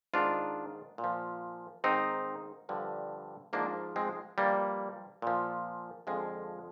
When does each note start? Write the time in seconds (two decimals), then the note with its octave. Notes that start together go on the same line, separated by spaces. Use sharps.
0.14 G#2 D#3 D4 F4
0.98 A#2
1.04 F3
1.84 G#2 D#3 C4 D#4
2.69 G2 D3 F3
3.53 G#2 F3 A#3 D4
3.96 G#3 C4
4.38 G2 F3 G3 A#3
5.22 A#2 F3
6.07 F2 D3 F3 G#3